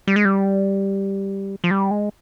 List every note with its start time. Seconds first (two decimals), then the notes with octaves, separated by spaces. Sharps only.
0.07 G3
0.16 G#3
0.25 G3
1.64 F3
1.71 G3
1.91 G#3